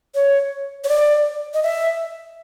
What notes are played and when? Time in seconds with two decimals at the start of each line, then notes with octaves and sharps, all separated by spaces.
0.15 C#5
0.84 C#5
0.89 D5
1.54 D#5
1.63 E5